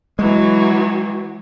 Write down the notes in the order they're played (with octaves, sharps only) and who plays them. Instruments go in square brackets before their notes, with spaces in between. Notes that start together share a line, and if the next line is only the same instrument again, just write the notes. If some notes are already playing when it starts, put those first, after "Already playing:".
[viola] E3 F#3 [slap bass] G#3